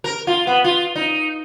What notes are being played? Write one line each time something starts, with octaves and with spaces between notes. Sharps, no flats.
A#4
F4
B3
F4
D#4